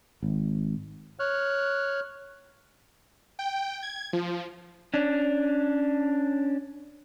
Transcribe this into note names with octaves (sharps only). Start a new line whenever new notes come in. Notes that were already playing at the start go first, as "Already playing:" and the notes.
G#1
C#5 F6 F#6
G5
G#6
F3
C#4 D4